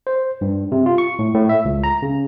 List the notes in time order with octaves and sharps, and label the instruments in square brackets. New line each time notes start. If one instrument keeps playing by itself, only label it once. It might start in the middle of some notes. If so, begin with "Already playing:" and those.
[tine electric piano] C5
G2
C3
F4
C#6
A2
A2
E5
C#2
A#5
C#3